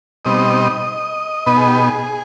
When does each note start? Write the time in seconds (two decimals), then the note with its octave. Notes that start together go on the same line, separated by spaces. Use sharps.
0.25 B2 G3 C4 D#4 D#5
1.46 B2 B3 D#4 B4
1.57 G#4
1.67 G4
1.78 G#4